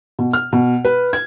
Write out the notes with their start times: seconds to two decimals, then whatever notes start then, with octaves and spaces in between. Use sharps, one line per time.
0.19 B2
0.33 F6
0.53 B2
0.85 B4
1.13 G#6